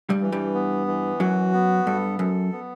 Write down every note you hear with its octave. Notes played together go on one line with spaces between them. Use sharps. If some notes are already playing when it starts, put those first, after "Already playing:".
G2 G3
E3
G2 G3
B3
E3
F#2 F#3 F#4
B3
G2 A4
F#2 A4
B3